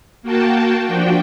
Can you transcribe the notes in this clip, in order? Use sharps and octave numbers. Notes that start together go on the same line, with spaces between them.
A#3 F#4 G5 A5
F3 D4 F#4 G5